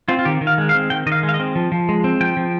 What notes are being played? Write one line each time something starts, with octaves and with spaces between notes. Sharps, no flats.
C4 F4
F4
D#3 G4
D#3
F5
G#3
F5
C4
D#3 G5
D#3 D#5
F5
G#3
F5
D#5
C4
F3
F3
G#3
C4
F3 G5
F3